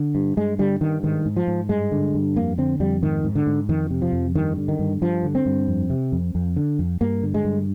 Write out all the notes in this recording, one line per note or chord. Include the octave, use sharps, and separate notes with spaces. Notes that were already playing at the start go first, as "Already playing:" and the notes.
Already playing: D3
G2
G2 G#3
D3 G3
G2 D#3
G#2 D#3
G#2
F3
G#2
G2 G#3
D3
G2
F2 A#3
D3 C4
F2 G3
G#2 D#3
G#2
D3
G#2
F2 D#3
C3
F3
F2
G2 D#3
D3
D#3
G2
G2 F3
D3
C4
G2
F2
C3
F2
F2
D3
F2
G2 A#3
D3
G#3
G2